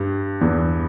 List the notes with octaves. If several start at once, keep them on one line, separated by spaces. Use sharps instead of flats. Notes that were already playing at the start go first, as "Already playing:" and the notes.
Already playing: G2
E2